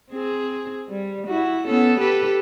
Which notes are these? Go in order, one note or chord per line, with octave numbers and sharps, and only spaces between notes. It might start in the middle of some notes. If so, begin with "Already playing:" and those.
C4 G#4
G3
E4 F#4
B3 C#4 A4
G4 A4 B4